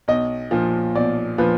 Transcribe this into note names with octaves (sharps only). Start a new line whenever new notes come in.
B1 D#5
A#2 F3
B1 D5
A#2 F3 B4